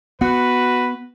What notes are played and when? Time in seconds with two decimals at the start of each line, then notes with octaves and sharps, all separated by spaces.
0.21 B3 F#4 B4